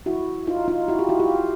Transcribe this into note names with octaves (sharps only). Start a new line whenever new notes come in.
E4 F#4
D#4 F4
D#4 F4
E4 F#4
F4 G4
E4 F#4
F4 G4